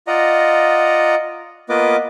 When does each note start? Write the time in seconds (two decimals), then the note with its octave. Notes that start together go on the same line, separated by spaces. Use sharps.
0.07 F4 D5 D#5 F#5 A#5
1.69 A#3 B3 F4 B4 D#5 D6